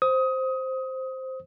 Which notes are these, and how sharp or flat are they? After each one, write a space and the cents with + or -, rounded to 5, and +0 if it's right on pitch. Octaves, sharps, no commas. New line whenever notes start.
C5 +0 D#6 +20